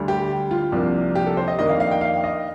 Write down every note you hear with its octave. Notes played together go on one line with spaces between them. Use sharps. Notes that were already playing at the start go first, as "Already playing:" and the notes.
Already playing: D2 D3 G3
G4
F4
C2 C3 F3 A#3 D4
G4
A4
C5
D#5
F2 D#3 A#3 D4 D#5
F5
F5
G5
F5
D#5